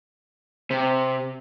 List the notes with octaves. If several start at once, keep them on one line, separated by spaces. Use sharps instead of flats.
C3 C4